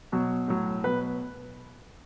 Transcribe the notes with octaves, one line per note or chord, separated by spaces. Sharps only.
B2 F#3
A2 F#3
B2 F#3 B4